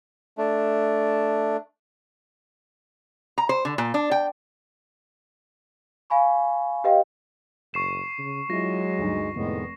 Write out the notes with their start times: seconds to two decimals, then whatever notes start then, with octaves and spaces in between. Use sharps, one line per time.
0.38 A3 D4
3.38 A#5
3.49 C5
3.65 D3
3.78 A#2
3.94 D4
4.11 G5
6.10 F5 G#5 B5 C#6
6.84 G4 B4 D#5 F5 G5
7.74 F#1 C#6 C7 E7
8.18 C#3
8.50 F#3 G#3 E4 F4 A#6
8.99 D2 G2 D#4
9.36 F1 A2 D#3 G#3 B3